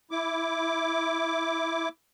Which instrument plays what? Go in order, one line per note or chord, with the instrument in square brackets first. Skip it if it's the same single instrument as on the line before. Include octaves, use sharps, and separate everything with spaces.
[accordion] E4 D6